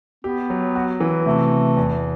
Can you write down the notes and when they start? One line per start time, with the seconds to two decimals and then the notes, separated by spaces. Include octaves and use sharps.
0.24 B3 G4
0.50 F#3
0.75 F#4
1.00 E3
1.26 C3 A3
1.51 C3
1.77 E2